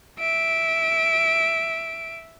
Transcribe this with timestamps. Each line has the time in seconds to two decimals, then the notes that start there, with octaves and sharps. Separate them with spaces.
0.19 E5 D7